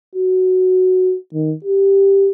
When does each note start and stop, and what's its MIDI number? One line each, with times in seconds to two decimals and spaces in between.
0.15 1.16 66
1.34 1.54 51
1.64 2.32 67